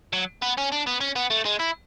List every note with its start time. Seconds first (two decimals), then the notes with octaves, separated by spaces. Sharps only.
0.13 F#3
0.42 B3
0.57 C#4
0.72 D4
0.86 B3
1.00 C#4
1.15 B3
1.30 A3
1.45 G#3
1.59 E4